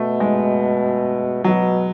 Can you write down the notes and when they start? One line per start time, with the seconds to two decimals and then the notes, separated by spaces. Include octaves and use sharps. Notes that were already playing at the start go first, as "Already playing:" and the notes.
Already playing: B2 A3
0.20 G#3
1.44 B2 F#3